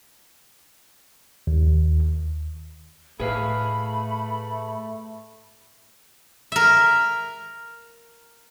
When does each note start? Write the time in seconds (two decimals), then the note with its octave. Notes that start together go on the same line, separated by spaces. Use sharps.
1.47 D#2
3.20 A2 A3 G#4 B4 F5 B5
6.52 A#4 E5